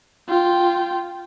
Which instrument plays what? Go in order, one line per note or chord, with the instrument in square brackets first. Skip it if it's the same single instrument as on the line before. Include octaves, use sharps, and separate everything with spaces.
[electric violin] F4 G5